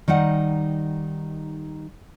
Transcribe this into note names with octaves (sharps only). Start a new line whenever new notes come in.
D#3 G3 D#4 F#5